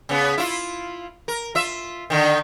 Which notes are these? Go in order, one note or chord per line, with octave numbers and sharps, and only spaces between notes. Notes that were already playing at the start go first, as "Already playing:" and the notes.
C#3 B3
E4 F4
A#4
F4 E5
D3 D#3